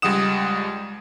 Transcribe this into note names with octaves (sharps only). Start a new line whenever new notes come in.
C#2 G3 G#3 F#5 D#6 E7